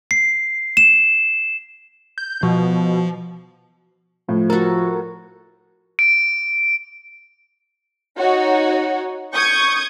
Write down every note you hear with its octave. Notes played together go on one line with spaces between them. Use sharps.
C7
E7
G6
B2 F3
A2 F3
F#4 A4 A#4
D7
D#4 F#4 C#5
C#6 D#6 G6 G#6